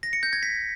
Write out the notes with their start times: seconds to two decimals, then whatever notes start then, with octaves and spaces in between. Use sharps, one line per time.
0.03 A#6
0.13 C#7
0.23 G6
0.33 G#6
0.43 B6